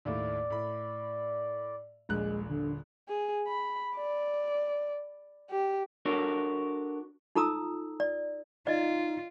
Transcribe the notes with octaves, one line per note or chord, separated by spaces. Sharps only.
D#2 A2 A3 D5
A2 B5
D#1 A#1 G#3 F#6
D3
G#4
B5
D5
G4
D4 F#4 A4 A#4 C#5
D#4 F4 A4 A#5 D#6 E6
D5
D#4 F4 D5 D#5